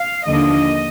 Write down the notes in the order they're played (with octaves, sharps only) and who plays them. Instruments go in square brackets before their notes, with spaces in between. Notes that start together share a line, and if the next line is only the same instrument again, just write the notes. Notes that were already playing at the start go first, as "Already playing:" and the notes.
Already playing: [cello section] F5
D#2 D3 F3 A#3 D4 D#5